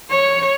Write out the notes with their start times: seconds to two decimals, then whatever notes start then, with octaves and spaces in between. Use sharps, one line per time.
0.10 C#5